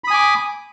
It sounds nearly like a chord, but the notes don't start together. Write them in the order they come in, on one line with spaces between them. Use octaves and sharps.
B5 D#6 G#5 D6